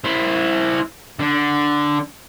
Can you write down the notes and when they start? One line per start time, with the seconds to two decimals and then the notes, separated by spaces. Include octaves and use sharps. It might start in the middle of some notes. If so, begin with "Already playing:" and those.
0.04 E4 C5
1.19 D3